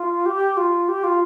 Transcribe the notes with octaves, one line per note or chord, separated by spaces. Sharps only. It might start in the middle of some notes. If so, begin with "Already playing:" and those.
Already playing: F4
G4
F4
G4
F4